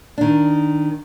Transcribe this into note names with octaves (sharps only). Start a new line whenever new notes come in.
D#3 D4